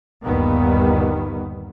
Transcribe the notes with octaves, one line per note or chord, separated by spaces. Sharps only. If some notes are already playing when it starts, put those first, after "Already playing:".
G1 D#2 A#2 D#3 G3 B3